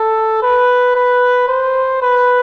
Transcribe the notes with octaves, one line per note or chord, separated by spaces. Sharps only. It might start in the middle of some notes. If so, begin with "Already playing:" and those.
Already playing: A4
B4
B4
C5
B4